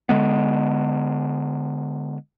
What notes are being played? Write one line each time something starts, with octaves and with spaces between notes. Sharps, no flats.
D3 G#3 B3